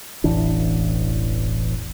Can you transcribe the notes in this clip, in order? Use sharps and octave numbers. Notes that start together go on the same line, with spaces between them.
E1 A1 E3 D4